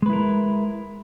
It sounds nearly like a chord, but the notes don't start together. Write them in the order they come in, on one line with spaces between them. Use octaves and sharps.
G#3 B4 E4 A#4